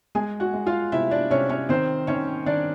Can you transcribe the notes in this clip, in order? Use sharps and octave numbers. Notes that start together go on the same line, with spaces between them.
G#3 G#4 G#5
F#4 F#5
G#3
F4 F5
C3 E4 E5
D4 D5
C3 C#4 C#5
C#4 C#5
D#3 C4 C5
D#3 C#4 C#5
D#3 D4 D5